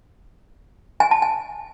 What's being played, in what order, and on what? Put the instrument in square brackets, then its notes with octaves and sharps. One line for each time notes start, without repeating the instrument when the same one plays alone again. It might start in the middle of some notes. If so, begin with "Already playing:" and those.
[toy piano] G#5
A5
G#5